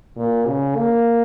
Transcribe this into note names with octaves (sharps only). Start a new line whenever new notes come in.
A#2
C#3
A#3